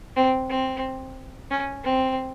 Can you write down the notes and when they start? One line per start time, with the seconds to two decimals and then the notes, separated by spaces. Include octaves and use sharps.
0.16 C4
0.49 C4
1.51 C#4
1.84 C4